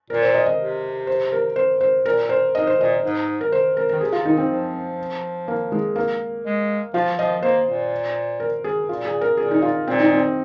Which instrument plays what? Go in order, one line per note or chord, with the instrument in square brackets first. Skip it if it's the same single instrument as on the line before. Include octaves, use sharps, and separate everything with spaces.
[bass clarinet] A#2 [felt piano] A#4
[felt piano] C5
D#5
D#5
[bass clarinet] C3
[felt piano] C5
A#4
C5
C5
[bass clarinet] A#2 [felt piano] A#4
[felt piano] C5
[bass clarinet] G#2 [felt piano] D#5
[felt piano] C5
[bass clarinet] A#2 [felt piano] D#5
[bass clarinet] G#2
[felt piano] A#4
C5
A#4
[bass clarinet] D#3 [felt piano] A#4
[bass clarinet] C3 [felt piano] G#4
[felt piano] F4
[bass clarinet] D#3 [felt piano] D#4
[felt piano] C4
[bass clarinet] F3
[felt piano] A#3
G#3
A#3
[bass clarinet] G#3
[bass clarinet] F3 [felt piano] F4
[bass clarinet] F3 [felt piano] D#5
[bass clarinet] A#3 [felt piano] C5
[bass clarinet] A#2
[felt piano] A#4
G#4
[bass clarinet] A#2 [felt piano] F4
[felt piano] G#4
A#4
[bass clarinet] A#2 [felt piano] G#4
[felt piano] D#4
F4
[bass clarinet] A#2 [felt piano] C4
[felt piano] D#4
C4